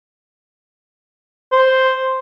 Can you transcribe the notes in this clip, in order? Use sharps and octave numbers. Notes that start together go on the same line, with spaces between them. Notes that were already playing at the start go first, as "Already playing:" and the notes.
C5